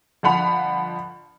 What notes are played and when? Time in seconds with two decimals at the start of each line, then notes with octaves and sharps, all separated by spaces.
0.23 G1 F3 F#5 B5 F7